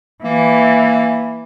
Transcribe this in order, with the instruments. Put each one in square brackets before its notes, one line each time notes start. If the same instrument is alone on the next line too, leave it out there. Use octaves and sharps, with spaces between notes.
[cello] E3 [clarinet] A#3